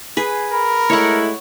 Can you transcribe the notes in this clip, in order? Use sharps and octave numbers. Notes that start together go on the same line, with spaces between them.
G#4 B4
A#4 B5
G#3 A3 E4 C#5 F#5